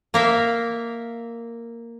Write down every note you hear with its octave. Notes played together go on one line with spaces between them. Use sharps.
A#3 A#4 E5 F5